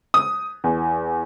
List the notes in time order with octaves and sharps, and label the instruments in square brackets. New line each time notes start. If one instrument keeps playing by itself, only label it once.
[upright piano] D#6
E2